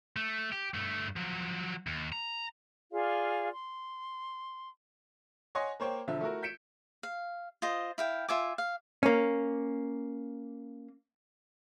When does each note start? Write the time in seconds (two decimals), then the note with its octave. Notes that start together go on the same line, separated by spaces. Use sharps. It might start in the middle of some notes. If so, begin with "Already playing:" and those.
0.16 A3
0.52 G4
0.74 G2 A3
1.16 F3 F#3
1.87 D#2
2.12 A#5
2.92 F4 G#4 D5 F5
3.53 C6
5.55 C#5 D#5 F#5 G#5 C6
5.80 A#3 C5 C#5 G5
6.08 E1 D3 F3 E5
6.21 A3 E4 F#4 A#4
6.43 G6 B6 C#7 D7 E7
7.03 F5
7.62 F4 C5 D#5
7.98 E4 F5 G5
8.29 F4 E5 G#5 D6
8.58 F5
9.03 A#3 C#4